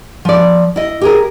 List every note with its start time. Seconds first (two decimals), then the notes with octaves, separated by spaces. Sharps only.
0.25 F3 D5
0.76 E4 D#5
1.01 G4 G#4 A#4